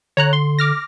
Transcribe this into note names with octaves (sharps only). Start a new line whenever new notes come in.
D3 C#5 A#5 F#6
C6
D6 F6 A#6